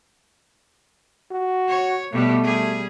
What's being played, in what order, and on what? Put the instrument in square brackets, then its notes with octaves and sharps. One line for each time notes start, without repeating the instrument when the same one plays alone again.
[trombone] F#4
[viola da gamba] C#5
[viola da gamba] B2 G3 B3 [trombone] A3
[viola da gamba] G3 G#4